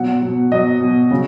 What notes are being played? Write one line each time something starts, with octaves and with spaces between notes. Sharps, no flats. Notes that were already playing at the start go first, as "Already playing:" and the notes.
Already playing: B2 F#3 F#5
B2 F#3
B2 F#3 D#5
B2 F#3
C#3 F#3